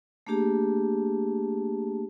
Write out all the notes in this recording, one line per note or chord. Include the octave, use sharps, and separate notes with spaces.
A3 A#3 D4 G4 G#4 A5